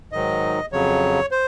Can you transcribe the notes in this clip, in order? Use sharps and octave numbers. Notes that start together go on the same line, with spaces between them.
G#2 D#3 F#3 D#5
F2 C#3 F#3 C#5
C5